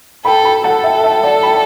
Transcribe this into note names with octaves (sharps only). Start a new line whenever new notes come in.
A4 G5 B5
G5 B5
A4 F#5 A5
E5 G5
E5 G5
D5 F#5
G5 B5